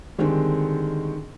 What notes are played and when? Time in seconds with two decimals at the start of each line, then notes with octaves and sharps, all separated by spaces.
0.18 D3 D#3 G3 G#3 C4